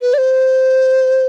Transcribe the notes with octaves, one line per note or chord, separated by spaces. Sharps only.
B4
D5
C5